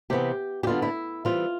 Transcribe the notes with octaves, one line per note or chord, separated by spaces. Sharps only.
C3 E3 B3 G4
G4
D3 G3 B3 F4
E4
E3 G3 C4 F4